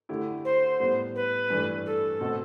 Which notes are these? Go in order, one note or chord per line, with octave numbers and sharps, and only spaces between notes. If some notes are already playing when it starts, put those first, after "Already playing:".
D3 A3 E4 G4
C5
A2 G3 B3
B4
G2 E3 A3 D4
A4
B2 A3 C4 F#4